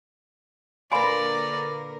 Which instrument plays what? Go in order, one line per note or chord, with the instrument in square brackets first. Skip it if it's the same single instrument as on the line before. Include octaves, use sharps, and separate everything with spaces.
[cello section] A#2 D3 A#4 [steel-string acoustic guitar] B4 F5 [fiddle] D5 [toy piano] G#5 B5